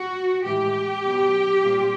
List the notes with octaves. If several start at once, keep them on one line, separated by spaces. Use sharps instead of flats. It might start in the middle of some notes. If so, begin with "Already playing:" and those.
Already playing: F#4
A2 E3 G#3 G4
B2 F#3 B3
A#2 G3 C4 F4